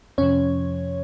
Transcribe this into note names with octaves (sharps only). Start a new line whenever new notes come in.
F2 C3 F3 C#4 C#5